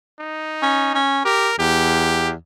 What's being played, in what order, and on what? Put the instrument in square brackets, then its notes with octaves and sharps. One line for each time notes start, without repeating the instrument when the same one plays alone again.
[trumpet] D#4
[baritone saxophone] C#4
C#4
[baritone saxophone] G4 [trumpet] A#4
[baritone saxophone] E2 [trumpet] G4